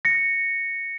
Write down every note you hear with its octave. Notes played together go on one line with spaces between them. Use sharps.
A#6 C#7